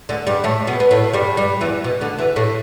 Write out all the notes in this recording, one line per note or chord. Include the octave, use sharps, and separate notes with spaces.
D2 D3
G2 G3
A2 A3
B2 B3
B3
A2 A3
G2 G3
G2 G3
E2 E3
B2
D2 D3
E2 E3
A2 A3